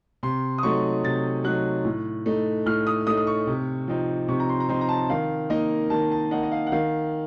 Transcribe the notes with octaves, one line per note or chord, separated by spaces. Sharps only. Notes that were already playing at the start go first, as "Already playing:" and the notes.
C3 C6
D#6
F#3 A3 D#4 C#6
C3 A6
F#3 A3 D#4 F#6
A2
A3 D#4
A2 F6
D#6
A3 D#4 D#6
D#6
C#6
C3
F3 C4 D#4
C3 C#6
A#5
C6
A#5
F3 C4 D#4 C6
A#5
A5
D#3 F5
A#3 D#4 D#5
D#3 A5
A5
A#3 D#4 F#5
D#5
F5
F#5
D#3 F5